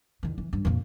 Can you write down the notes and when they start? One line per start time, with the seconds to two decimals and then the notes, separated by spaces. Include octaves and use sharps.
0.23 E2 D#3
0.38 E3
0.53 G2
0.65 F2 A#2